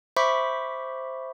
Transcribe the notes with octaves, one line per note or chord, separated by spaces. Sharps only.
C5 E5 B5 C#6 D6 B6